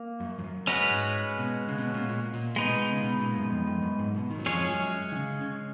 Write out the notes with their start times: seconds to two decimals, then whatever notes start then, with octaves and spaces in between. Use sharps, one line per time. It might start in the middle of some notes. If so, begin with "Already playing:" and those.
Already playing: A#3
0.20 F#2
0.39 F2
0.44 F#2
0.67 G#3 C#4 F#4 B4
0.91 G#2
1.38 B2
1.68 C#3
1.78 B2
1.94 A#2
2.09 A#2
2.33 A#2
2.56 G#3 B3 D#4
2.68 B2
2.93 C#3
3.04 B2
3.20 A#2
3.36 F#2
3.51 F2
3.67 F2
3.82 F#2
3.99 G#2
4.15 B2
4.30 D#3
4.38 F#3
4.45 F2 F3 G#3 C#4 G#4 C#5
4.69 F#2 F#3
5.12 D#3
5.16 C#3
5.41 C#3